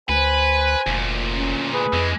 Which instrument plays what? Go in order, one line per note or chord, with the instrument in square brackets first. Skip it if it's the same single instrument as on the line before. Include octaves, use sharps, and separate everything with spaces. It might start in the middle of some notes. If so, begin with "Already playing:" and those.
[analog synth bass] D2 [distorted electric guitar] B4 [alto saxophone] C5 [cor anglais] G#5
[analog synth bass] F1 [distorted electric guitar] D2 A#2
[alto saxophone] C#4
[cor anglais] G#4 [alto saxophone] B4
[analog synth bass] F2 [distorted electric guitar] E3 G#3